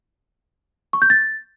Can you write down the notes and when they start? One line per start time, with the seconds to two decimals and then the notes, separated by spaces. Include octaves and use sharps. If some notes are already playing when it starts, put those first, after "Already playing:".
0.93 C#6
1.02 G6
1.10 A6